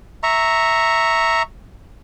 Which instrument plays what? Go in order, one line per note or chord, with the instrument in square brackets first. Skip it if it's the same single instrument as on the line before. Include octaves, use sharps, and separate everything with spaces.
[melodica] E5 A#5 C#6